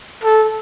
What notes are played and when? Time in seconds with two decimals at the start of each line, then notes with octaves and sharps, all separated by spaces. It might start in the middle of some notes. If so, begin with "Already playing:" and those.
0.23 A4